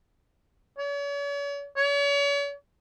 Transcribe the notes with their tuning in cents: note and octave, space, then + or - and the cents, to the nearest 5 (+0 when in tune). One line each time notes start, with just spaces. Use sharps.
C#5 +45
C#5 +40